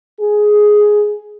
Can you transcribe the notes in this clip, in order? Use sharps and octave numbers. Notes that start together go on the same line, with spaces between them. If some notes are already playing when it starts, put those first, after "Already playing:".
G#4